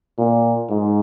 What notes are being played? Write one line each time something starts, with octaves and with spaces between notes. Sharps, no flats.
A#2
G#2